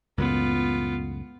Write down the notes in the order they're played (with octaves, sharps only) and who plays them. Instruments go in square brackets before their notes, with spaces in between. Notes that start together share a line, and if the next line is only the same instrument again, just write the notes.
[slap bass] C#2 F#2 A2 [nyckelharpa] B3 F4